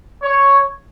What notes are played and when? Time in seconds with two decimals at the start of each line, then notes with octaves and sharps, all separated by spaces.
0.23 C#5